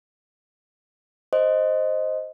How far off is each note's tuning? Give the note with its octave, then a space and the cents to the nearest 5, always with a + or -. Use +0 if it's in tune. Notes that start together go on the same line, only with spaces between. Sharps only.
C5 +0 D#5 +0